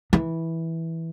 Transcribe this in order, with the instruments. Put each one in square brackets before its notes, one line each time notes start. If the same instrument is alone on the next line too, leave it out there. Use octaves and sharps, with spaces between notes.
[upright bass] E3